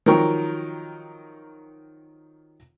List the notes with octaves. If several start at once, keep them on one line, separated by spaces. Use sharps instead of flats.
D#3 F3 F#3 A#4 G5 C#6